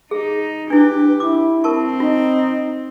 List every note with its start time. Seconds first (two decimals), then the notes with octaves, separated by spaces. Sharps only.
0.11 D#4 G#4
0.70 D4 E4 G4 B4
1.20 E4 D6
1.64 C4 A#4 A5 C#6
2.00 D#4 F4